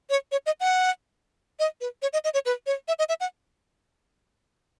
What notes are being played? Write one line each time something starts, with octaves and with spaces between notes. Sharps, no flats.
C#5
C#5
D#5
F#5
D#5
B4
C#5
D#5
D#5
C#5
B4
C#5
E5
D#5
E5
F#5